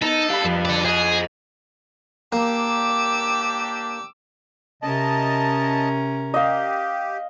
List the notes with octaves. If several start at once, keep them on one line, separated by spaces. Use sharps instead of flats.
B3 D#4 A4
G2 G4 F5 B5
F2
A4 D5
G#4 C5 D#5
A#3 D4 G4 D6 E6
C3 C#4 A#4 D#5 A5
G4 D#5 F5